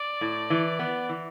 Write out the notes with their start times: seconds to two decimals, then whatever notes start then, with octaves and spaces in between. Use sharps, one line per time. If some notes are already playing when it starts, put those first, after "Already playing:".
Already playing: D5
0.21 A2
0.50 E3
0.79 B3
1.09 E3